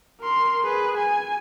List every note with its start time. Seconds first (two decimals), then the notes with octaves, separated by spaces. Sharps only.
0.21 A#4 C6
0.64 G#4 B4
0.97 G#5